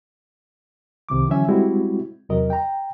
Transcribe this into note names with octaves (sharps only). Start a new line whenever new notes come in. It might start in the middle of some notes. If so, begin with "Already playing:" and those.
C2 C3 D#3 D6
D3 E3 F#3 C#4 E5 G#5
G3 G#3 C4 E4 F#4
E2 C3 F#3 A#4 D#5
G5 A#5